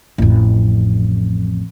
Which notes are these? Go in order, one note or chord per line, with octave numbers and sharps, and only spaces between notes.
A1 F2